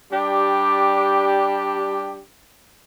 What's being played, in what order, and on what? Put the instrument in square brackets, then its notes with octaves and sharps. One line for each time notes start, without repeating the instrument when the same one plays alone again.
[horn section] G3 D4 G4